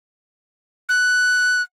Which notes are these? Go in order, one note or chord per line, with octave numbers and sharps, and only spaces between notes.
F#6